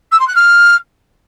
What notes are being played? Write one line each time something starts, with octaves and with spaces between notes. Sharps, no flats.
E6
C6
F#6
F6